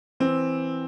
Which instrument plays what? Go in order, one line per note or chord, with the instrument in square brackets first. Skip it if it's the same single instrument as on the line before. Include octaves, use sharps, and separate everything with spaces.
[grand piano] E3 C4